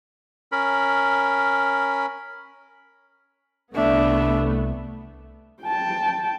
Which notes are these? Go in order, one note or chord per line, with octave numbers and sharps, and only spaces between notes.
C#4 A#4 B5
C2 A3 B3 D4 E5
G5 A5